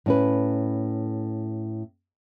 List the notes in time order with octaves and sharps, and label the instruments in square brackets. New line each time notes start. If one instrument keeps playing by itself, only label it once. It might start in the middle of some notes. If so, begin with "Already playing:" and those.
[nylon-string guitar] A2 C#4 B4